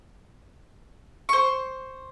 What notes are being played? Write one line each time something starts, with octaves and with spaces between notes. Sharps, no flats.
C5 C#6